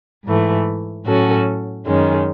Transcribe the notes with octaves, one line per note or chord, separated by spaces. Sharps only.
G#2 E3 A3
A2 F#3 C#4 F#4 A4
F#2 D#3 G#3 C#4